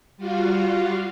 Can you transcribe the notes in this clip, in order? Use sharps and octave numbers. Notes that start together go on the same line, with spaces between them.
G3 F4 F#4 F5